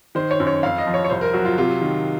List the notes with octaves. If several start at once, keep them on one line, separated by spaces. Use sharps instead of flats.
D#3 C5
C#5
F#2
C#5
F2 F5
D#5
F3
C#5
C#5
C2 C5
A#4
F#3 F#4
F4
C3 F4
D#3